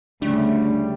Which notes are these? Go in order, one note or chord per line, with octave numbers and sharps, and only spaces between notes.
D2 C#3 G3 A3 D4